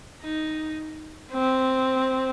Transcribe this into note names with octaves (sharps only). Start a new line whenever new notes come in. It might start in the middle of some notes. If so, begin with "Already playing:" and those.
D#4
C4